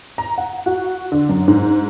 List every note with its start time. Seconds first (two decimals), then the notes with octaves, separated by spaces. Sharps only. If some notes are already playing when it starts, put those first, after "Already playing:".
0.18 A#5
0.38 F#5
0.66 F#4
1.12 D3
1.29 F#2
1.48 G#2